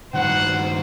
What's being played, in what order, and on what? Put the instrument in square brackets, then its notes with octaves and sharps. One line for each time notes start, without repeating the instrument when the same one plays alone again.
[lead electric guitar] G2 D#3 [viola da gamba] C5 [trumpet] F#5